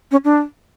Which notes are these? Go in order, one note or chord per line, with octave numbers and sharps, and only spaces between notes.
C#4
D4